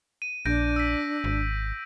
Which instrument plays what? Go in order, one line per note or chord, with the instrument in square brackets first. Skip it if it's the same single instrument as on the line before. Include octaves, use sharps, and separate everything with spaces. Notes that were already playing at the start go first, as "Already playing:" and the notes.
[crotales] D#7
[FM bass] A#1 [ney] D4 [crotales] G6 A#6 D7
[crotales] E6 B6
[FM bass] G#1